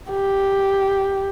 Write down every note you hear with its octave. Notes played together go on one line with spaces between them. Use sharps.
G4